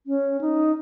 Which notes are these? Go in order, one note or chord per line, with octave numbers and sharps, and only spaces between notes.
C#4
D#4